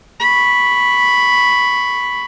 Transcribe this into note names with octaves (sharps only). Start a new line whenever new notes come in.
B5 C#6